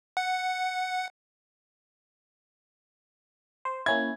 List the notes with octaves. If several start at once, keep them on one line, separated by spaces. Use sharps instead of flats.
F#5
C5
A#3 C#4 E4 G#6